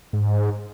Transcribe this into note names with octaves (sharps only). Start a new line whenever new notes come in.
G#2